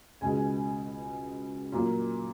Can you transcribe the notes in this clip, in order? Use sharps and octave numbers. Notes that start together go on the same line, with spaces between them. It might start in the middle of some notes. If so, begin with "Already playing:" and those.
C#2 B2 G#3 G#5
A#2 F#3 A#3